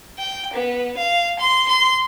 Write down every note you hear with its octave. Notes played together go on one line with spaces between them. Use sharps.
G5
B3
F5
C6
C6